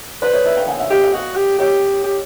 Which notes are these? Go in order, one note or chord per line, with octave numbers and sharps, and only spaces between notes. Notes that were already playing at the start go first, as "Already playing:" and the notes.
B4 C5 D5
C#5 D#5
D5 E5
F5 G5
F#5 G#5
E5 F#5
G4 D#5 F5
D#5 F5
F#4 D#5 F5
G4
G4 C#5 D#5
G4